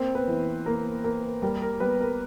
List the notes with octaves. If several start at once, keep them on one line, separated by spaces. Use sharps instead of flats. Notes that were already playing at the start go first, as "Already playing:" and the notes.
Already playing: A#3 C4 C5
B3 B4
E3
A#3 A#4
A#3 A#4
G3 A#4
A#4
G3 B3 B4
A#4